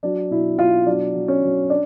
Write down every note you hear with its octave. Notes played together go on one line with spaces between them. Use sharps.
F#3 D4
B2 E4
B2 F4
F#3 D4
F#3
C#4
F#3
D4